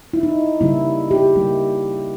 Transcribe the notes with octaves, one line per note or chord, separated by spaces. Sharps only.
E4
D#4
C#3 G3 A#3 E4
G4
C#3 G3 A#3